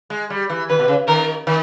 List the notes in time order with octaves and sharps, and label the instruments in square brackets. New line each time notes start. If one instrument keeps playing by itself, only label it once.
[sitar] G#3
G3
E3
[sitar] D#3 [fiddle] B4
[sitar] B2
C#3
[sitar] D#3 [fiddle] A#4
[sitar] D#3